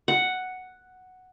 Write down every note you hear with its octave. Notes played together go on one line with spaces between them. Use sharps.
F#5